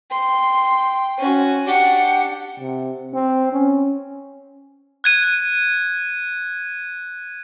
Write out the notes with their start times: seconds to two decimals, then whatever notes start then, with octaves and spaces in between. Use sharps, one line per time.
0.11 G5 C6
1.18 C#4 F#4
1.67 D4 G4 F#5
2.60 C3
3.13 C4
3.53 C#4
5.04 F#6 G#6 D#7